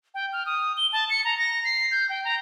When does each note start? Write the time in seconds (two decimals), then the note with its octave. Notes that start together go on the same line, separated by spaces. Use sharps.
0.14 G5
0.33 F6
0.46 D#6
0.77 G7
0.93 A5
1.10 C#7
1.25 A#5
1.38 A#6
1.65 C7
1.91 G6
2.09 G5
2.24 A#5